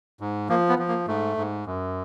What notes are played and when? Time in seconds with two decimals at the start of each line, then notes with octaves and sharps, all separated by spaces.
0.20 G#2
0.49 F3 A#3
0.69 B3
0.79 F3
0.88 A#3
1.08 G#2 A3
1.37 G#2
1.66 F#2